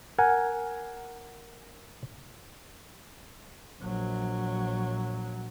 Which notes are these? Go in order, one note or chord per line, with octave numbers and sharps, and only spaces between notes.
A#4 F#5 G#5
A#1 F#3